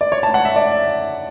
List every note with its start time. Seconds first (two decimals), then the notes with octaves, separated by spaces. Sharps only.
0.01 D5
0.12 C#5
0.23 A5
0.34 F#5
0.45 E5
0.56 D5